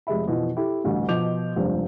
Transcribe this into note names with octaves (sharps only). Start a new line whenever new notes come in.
F1 G#3 G4 E5 B5
F2 B2 E3 F3
E4 G4 A4
A1 D2 G2
B2 F3 D#5 D6 G6 F7
F1 C#2 G2 C5